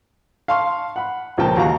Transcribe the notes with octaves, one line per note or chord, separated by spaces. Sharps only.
F5 A5 C6 C#6 F6
F#5 B5
C#2 A#2 F3 A#3 G5 A5
D#2 F#4 G4 F5 A#5